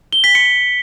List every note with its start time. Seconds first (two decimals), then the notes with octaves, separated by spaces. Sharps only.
0.13 G7
0.24 B6
0.35 C#7